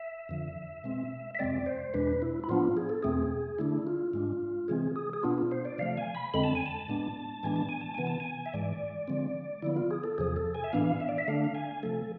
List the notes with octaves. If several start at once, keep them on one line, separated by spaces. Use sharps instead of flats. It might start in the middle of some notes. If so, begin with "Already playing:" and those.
Already playing: E5
F2 D3 F3
B2 G#3 C4
E5
F2 C3 G#3 C4 D5
C5
E2 B2 G#3 D4 B4
E4
E4
A2 F3 B3 D4 F4
G#4
A4
E2 B2 A3 C4 G#4
D3 A3 D4 E4
F4
G#2 G#3 D4
C3 E3 G#3 C4 G#4
G#4
G#4
B2 B3 D4 F4
F4
C5
D5
C3 F3 A3 F5
G#5
B5
F2 D3 G#3 C4 B5
A5
G#5
A5
A2 G#3 B3 D4
A2 E3 G#3 B3 D4 G#5
A5
G#5
A5
C3 E3 B3 G#5
A5
G#5
E5
G#2 E3 G#3 D5
D3 F3 G#3 C4
D3 F3 B3 E4
F4
G#4
A4
E2 C3 F3 G#4
A4
G#5
E5
A2 E3 B3 D4 F5
E5
D5
E5
D3 A3 D4 F5
F5
G#5
C3 F3 A3 A4